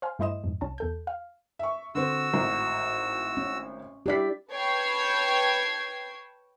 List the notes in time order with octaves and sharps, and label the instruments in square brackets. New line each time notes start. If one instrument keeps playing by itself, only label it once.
[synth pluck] C5 F5 G#5
G2 A3 E4 C5 D#5 E7
F2 G#2
C2 C#4 A5
E2 A4 G6
F5
[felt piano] E5 C#6
[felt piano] D3 C4 [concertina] F#4 E6
[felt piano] G#1 A2 A#5
[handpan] C#4
[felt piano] D4 E4 B6 [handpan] G4 D5
[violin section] B4 C#5 G5 A5 G#6 C7